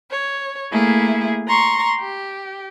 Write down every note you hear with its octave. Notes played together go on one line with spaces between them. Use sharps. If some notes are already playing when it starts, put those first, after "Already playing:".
C#5
A3 A#3 E4 G#4
A#5 C6 C#6
G4